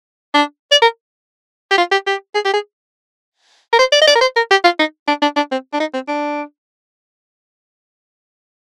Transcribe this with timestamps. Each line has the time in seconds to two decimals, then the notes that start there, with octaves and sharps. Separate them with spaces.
0.34 D4
0.71 D5
0.82 A#4
1.71 G4
1.78 F4
1.92 G4
2.07 G4
2.34 G#4
2.45 G4
2.53 G#4
3.73 A#4
3.79 C5
3.92 D5
4.01 D#5
4.07 D5
4.15 A#4
4.21 C5
4.36 A#4
4.51 G4
4.64 F4
4.79 D#4
5.08 D4
5.22 D4
5.36 D4
5.51 C4
5.73 D4
5.80 D#4
5.94 C4
6.08 D4